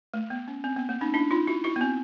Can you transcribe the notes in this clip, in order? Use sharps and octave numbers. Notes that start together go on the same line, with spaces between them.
A3
B3
C#4
C4
B3
A#3
C#4 D#4
D4 E4
D#4 F4
E4 F#4
E4 F#4
B3
C4